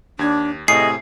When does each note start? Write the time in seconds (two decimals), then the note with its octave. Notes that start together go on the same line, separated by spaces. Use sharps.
0.19 D#2 D4 G#6
0.68 A2 C3 G#4 D#5 C7